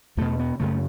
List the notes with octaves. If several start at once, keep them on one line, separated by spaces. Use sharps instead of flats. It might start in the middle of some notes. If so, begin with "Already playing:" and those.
E2 B2 A3
B3
F#2 C#3 A3